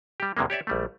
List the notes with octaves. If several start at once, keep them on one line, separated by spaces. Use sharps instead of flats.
G3 G4
E2 C3 E3 G#3 A#3
G4 C#5 D5 E5
A#1 G3 A3